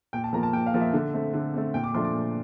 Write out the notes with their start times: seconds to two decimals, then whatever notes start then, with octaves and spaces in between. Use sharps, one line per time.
0.13 A#2 G5
0.24 A5
0.33 F3 A#3 A#5
0.43 A5
0.53 A#2 G5
0.66 F5
0.74 F3 A#3
0.80 E5
0.93 D3
1.14 A3 C4
1.33 D3
1.54 A3 C4
1.74 A#2 G5
1.84 D6
1.94 F3 A3 D4 C6
2.04 D6
2.15 A#2